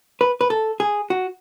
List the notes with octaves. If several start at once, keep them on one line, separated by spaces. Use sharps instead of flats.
B4
B4
A4
G#4
F#4